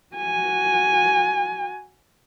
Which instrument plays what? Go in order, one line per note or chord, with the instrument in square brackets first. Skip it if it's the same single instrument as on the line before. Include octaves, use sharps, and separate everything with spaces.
[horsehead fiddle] F#4 G#5